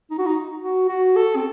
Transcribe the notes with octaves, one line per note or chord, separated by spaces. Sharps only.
D#4
F#4
D#4
F#4
F#4
A4
C4